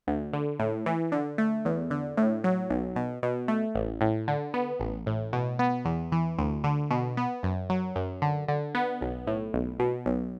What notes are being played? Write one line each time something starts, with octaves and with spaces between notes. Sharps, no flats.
D2
D3
A2
E3
D3
A3
E2
D3
A2
F#3
B1
B2
B2
A3
A1
A2
D3
B3
A1
A2
B2
B3
E2
E3
D2
D3
B2
B3
F#2
F#3
F#2
D3
D3
B3
B1
A2
B1
B2
B1